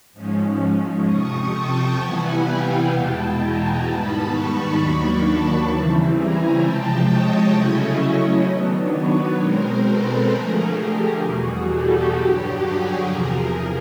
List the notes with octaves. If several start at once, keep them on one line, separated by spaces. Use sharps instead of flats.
G#2 F3 G#3 C#4
F2 C3 F3 C#6 D#6
G5 A5
C3 E3 G3 B3 E4 F#5 G#5
F5 G5
E2 B2 G#3 B3 E4 G5 A5
G#5 A#5
G#2 D#3 G3 B3 A5 B5
B5 C#6
D#2 D#3 F#3 A#3 D4 B5 C#6
A5 B5
C#3 E3 G3 C4 E4
G#5 A#5
C3 F3 G#3 G5 A5
C#5 D#5
C#3 F#3 A3 C#4 E4 C#5 D#5
D#3 F#3 B3 D4
B4 C#5
B2 G#3 C4 A#4 C5
A4 B4
D3 F3 A3 G#4 A#4
G4
E2 B2 G3 F#4 G#4
G4 A4
G2 D3 F#3 G4
F#4 G#4
E2 C3 F3 G#4 A#4